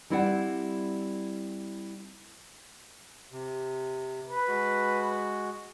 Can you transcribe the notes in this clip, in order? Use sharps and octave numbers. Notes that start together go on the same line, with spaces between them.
G3 C4 E4 D5 F#5
C3
B4
G#3 F#4